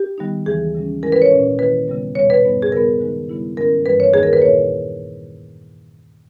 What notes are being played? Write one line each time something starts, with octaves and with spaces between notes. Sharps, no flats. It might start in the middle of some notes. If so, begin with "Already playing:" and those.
Already playing: G4
D#3 G3 B3 D#4
D#2 C#3 E3 G#3 G#4
C#3 G3 C#4
G#2 E3 G#3 C#4 E4 A#4
B4
C#5
A#2 G#3 C#4
D#3 A#3 E4 B4
C#3 G3 B3
E2 B2 G3 C#5
B4
G2 G3 B3 D#4
G#4
C#3 G3 B3 A#4
D#3 G#3 D#4
C#3 G3 B3 E4
G#2 D#3 G#3 C#4 A#4
G2 E3 G3 B4
C#5
E2 D#3 A#3 D#4 G#4
A#4
B4
A#2 A#3 E4 C#5